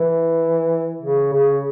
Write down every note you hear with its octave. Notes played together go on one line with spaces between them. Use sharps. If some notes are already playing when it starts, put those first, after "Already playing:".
Already playing: E3
C#3
C#3